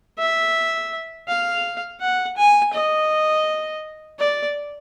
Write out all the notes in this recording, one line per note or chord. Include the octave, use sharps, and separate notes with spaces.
E5
F5
F#5
G#5
D#5
D5